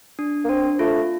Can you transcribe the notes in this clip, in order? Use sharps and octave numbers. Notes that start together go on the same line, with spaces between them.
D4
A#3
C4 D4
A3 F4